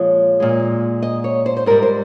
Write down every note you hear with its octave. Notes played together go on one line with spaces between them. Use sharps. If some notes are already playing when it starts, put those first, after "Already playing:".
Already playing: A#2 F3 G#3 C#5
A#2 G#3
D#5
C#5
C5
C5
G#2 G3 A#4
C5